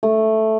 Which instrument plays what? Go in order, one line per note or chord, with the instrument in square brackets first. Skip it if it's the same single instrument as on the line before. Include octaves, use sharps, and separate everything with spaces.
[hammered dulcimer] A3